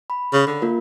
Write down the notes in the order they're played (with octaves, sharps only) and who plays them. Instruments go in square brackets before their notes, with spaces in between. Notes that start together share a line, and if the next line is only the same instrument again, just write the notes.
[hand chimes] B5
[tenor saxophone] C#3
D3
[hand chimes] A#3 F4 A#4